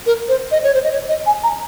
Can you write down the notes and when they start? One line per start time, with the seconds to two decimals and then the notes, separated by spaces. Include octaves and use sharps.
0.06 A#4
0.28 C5
0.51 D#5
0.63 C#5
0.74 C5
0.83 D#5
0.92 C#5
1.08 D#5
1.26 G#5
1.43 A#5